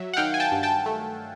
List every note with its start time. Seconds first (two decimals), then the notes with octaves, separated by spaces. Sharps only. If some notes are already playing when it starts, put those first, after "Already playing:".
Already playing: F#3 E5
0.13 F#5
0.17 D#3 F5 G5
0.34 G#5
0.40 G5 A5
0.52 G2
0.63 G5 A5
0.86 A3